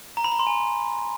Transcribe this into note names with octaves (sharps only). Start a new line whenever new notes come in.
A#5
B5
A#5
C6
G#5